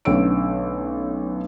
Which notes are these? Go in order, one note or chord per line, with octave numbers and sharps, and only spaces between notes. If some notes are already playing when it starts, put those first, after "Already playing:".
B1 D3 A3 C#4 E6 D7